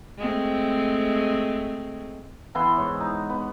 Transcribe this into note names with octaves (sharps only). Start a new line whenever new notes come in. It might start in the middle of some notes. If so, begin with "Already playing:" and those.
G#3 A3 C4
E3 B3 E4 C6
G#2 C#5
D#4
B3